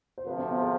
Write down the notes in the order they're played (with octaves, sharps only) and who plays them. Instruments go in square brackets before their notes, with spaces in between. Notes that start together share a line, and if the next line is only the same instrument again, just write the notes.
[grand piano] C5
[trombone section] D2 C3 F3 [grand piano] B4
[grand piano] D4
B3
G#4